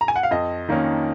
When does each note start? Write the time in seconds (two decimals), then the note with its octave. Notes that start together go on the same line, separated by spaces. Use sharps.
0.01 A#5
0.08 G#5
0.16 F#5
0.23 F5
0.31 F2 D#5
0.69 D#3 A#3 C#4